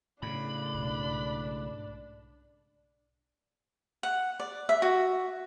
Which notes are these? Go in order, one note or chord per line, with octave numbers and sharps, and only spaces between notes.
A2 C#3 D4 B5
B1 G#2
F#5
D5
E5
F#4